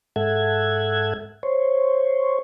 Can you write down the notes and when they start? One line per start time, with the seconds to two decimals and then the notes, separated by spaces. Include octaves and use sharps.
0.16 G#2 A4 E5 F#5 G#6
1.43 C5 C#5